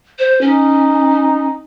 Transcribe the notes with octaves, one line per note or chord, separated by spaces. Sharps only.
C5
C#4 D#4